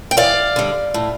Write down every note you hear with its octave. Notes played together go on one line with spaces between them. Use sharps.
G5
E2 D5 F5
D3 G3
A2